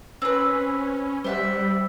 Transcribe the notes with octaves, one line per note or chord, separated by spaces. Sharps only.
C4 C#4 B4
G3 C5 E5 F#5